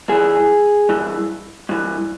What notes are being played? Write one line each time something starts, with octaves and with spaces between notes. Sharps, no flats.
G2 E3 G#4
G2 E3
G2 E3